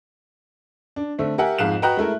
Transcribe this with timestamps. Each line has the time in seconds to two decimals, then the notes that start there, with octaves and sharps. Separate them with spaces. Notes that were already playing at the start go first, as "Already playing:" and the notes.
0.96 D4
1.18 D3 A3 C4
1.38 G4 A#4 E5 F#5 G#5
1.59 F2 G#2 F5 F#6 E7
1.82 F#4 B4 D#5 G5 A#5 F#6
1.97 G#3 A3 E4 A#4